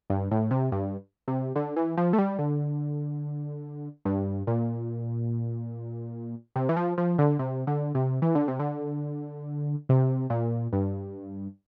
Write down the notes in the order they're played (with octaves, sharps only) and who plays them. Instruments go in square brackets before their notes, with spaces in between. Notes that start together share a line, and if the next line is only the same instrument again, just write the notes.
[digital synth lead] G2
A2
C3
G2
C3
D3
E3
F3
A3
G3
D3
G2
A#2
C3
E3
F3
F3
D3
C3
D3
C3
E3
D3
C3
D3
C3
A#2
G2